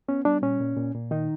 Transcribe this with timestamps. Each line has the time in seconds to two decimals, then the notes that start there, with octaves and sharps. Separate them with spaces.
0.08 B3 C#4
0.25 G3 D4
0.42 A#2 C#4
0.60 A#2
0.77 A#2
0.95 A#2
1.11 D#3 D#4